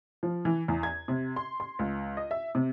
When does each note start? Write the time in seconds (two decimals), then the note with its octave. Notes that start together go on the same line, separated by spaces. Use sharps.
0.23 F3
0.45 E3
0.68 E2
0.83 G#6
1.08 C3
1.36 C6
1.60 C6
1.79 C#2
2.17 D#5
2.31 E5
2.55 C3